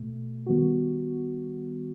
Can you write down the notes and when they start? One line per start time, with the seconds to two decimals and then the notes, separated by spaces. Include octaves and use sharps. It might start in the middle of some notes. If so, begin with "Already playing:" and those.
Already playing: B2 A3
0.46 D#3 G3 B3 F#4